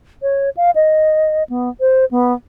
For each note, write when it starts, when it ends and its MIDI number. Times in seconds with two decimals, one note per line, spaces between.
0.22 0.50 73
0.57 0.71 77
0.75 1.43 75
1.49 1.70 59
1.80 2.05 72
2.11 2.33 59